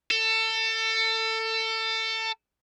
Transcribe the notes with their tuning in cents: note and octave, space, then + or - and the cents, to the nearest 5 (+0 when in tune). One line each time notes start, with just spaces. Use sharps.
A4 +25